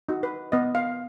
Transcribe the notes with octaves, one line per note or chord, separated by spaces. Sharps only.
D#4 F#4
B4
B3 D#5
F5